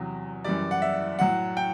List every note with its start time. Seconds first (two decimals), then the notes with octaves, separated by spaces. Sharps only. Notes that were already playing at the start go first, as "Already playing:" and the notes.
Already playing: E2 C3 F#3
0.44 F#2 E3 G3 D5
0.71 F#5
0.82 E5
1.19 A2 F#3 F#5
1.57 G5